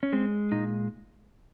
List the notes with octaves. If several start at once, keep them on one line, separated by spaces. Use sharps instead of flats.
C#4
G#3 C4
A#2 D#4